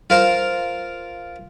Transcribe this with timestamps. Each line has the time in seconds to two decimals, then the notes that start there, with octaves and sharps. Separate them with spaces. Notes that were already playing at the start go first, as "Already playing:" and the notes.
0.10 F4 A#4 C5